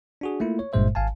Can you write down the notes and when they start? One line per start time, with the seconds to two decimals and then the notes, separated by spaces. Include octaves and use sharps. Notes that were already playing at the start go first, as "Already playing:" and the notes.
0.21 D4 F#4 G#4
0.40 A3 A#3 E4 F4
0.59 C#5
0.73 G1 G2 A#2 G#3 C5 E5
0.95 G#1 F5 G#5 A5